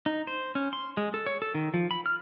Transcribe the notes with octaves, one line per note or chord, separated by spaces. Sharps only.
D#4
C5
C#4
C6
G#3
A4
C#5
A4
D#3
F3
B5
F6